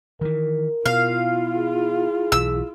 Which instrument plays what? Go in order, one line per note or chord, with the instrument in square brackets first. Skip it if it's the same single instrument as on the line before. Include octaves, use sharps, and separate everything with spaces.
[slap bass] D#3 E3 [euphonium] A#4
[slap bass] B2 [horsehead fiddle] E4 F4 [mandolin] F5
[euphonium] G#4
[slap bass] B1 E3 [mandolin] E6